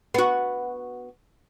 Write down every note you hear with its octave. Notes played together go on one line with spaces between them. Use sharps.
B3 F#4